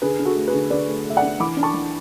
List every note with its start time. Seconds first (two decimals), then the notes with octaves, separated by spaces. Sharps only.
0.02 D3 G#4 B4
0.19 D3
0.25 F#4 A4
0.36 A3
0.48 G#4 B4
0.53 D3
0.70 D3 B4 D5
0.88 A3
1.05 A3 E5
1.16 D5 F#5
1.23 D4
1.40 E3 B5 D6
1.57 D4
1.63 A5 C#6
1.74 E3